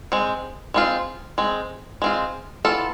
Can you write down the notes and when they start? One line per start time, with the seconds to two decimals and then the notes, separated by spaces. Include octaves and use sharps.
0.12 G#3 C4
0.74 G#3 C4 F4
1.38 G#3 C4
2.02 G#3 C4 F4
2.65 E3 B3 F4 A4